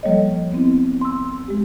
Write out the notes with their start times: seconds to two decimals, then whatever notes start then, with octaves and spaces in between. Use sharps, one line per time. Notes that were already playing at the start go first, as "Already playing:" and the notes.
0.03 F3 G3 A#3 A4 C#5 D#5
0.52 B3 C4 E4
1.01 C6 E6
1.48 G#3 G4